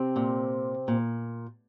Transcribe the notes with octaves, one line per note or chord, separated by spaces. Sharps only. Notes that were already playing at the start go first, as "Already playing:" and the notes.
Already playing: C3 C4
A#2
A#2